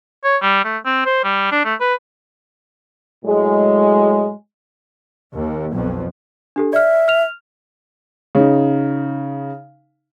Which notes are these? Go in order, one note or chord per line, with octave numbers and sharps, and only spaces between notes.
C#5
G3
A3
C4
C5
G3
D4
A3
B4
A2 F#3 G#3
D#2
B1 F2
D4 G4 A4
D5 E5 F6
F6 F7
C#3 D#4